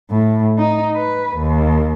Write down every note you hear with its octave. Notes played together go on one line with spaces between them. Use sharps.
A2
D#4
B4
D#2